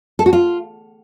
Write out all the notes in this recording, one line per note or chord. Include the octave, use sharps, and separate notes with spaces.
A4
F#4
F4